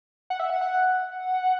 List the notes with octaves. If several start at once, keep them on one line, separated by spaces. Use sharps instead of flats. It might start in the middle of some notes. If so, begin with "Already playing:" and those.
F#5
E5
F#5
F#5